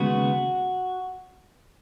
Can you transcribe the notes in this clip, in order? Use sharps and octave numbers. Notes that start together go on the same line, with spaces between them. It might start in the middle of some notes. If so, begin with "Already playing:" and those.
Already playing: D#2 C#3 G#3 B3 F#4